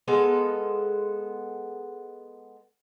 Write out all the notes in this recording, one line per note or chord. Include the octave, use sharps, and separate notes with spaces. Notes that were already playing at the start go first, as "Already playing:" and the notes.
G#3 B3 A4 F5